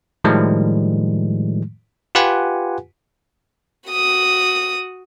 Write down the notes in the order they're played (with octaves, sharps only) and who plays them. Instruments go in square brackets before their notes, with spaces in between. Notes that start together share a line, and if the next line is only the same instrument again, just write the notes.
[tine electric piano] A2 D#3 F3 G3 G#3
F4 G4 B4 F#5 G#5
[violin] F#4 D#6